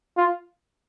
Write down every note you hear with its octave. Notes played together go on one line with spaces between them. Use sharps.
F4